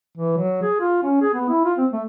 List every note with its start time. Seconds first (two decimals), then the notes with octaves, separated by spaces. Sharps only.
0.17 E3
0.37 F#3
0.63 G#4
0.81 F4
1.03 C#4
1.22 G#4
1.34 B3
1.49 E4
1.65 F4
1.78 C4
1.92 A3